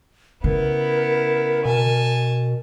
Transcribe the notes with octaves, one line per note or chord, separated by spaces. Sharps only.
C#3 B3 E4 A#4
B2 G#5 A5